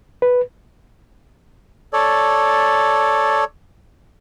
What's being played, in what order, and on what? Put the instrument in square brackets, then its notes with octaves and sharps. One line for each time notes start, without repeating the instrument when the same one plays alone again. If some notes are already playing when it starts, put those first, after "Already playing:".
[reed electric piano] B4
[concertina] A4 C#5 D5